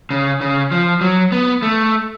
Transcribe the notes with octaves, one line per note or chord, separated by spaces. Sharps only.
C#3
C#3
F3
F#3
B3
A3